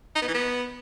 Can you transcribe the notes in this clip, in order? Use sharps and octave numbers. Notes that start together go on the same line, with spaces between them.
D#4
B3
E3
B3